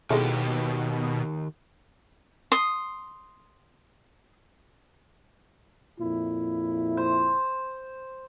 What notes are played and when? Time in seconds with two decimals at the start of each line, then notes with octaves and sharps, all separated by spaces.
0.10 B2 D#3 G#3 E4 G4 A4
2.52 C6 D#6
6.01 F2 A#2 E4
6.97 C5